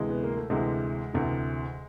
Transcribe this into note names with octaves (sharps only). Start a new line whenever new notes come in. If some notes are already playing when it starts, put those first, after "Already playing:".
Already playing: D2 C3 E3 G#3
B3
A#3
A3
D2 C3 E3 G#3
D2 C3 E3